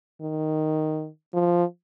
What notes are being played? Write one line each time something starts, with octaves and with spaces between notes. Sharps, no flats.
D#3
F3